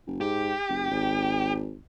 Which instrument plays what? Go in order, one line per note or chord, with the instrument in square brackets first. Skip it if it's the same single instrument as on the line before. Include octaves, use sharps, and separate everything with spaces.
[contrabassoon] F#1
[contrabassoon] G#2 [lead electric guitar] G4
[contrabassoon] F#1
G#1